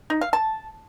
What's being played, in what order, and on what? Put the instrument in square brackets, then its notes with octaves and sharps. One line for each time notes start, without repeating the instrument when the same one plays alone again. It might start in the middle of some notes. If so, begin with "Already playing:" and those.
[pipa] D#4
F5
A5